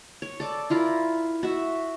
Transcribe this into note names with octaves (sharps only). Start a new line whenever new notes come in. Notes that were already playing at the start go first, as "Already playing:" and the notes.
C#5
A4 D5 D6
E4 F4 A#4 B5
F#4 E5